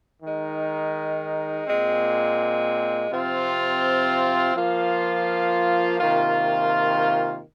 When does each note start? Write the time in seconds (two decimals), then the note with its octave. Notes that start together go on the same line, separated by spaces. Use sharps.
0.23 D#3 G#3 D#4
1.67 A#2 G#3 C4
3.11 C3 F3 C4 F4
4.55 F3 A#3 F4
5.99 C3 D#3 A#3 F4